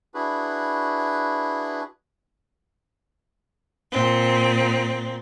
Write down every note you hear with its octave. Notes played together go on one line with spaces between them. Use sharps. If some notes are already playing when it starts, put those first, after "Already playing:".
D4 E4 F#4 G#4 B4
A#2 C4